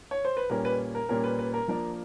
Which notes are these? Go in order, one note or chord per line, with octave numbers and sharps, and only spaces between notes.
C#5
C5
B4
A#2 G3 A#3 C#4 A#4
B4
A#4
A#2 G3 A#3 C#4 A#4
B4
B4
A#4
F3 A#3 D4 A#4